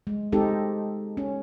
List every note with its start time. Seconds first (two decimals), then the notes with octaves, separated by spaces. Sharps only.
0.07 G#3
0.32 G#3 C4 D#4 G4 A4
1.17 C#4